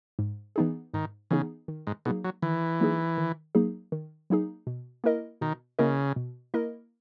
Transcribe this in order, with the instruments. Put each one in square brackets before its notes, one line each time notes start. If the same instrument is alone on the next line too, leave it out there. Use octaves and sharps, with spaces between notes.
[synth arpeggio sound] G#2
E3 B3 D#4 G#4
[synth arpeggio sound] G#2 [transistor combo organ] D#3
[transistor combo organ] C#3 [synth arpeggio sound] E3 B3 D#4 G#4
[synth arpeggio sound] D#3
[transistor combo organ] G#2
[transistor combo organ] B2 [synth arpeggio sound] F#3 A#3 D#4 G#4
[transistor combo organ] F#3
[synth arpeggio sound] D#3 [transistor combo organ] E3
[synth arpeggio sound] F#3 A#3 D#4 G#4
D#3
F#3 A#3 D#4 G#4
D#3
F#3 A#3 D#4 G#4
B2
A#3 E4 A#4 D#5
[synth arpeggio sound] B2 [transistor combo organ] D#3
[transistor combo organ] C#3 [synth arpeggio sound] A#3 E4 A#4 D#5
[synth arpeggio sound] B2
A#3 E4 A#4 D#5